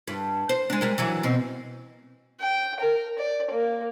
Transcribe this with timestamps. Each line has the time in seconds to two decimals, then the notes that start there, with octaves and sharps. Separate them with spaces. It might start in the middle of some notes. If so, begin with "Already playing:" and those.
0.08 G2
0.49 C5
0.70 G#3 D4
0.81 G3 G#3 A#4
0.98 E3 F#3 D4
1.23 B2 C4
2.40 G5
2.80 A#4
3.18 D5
3.51 A#3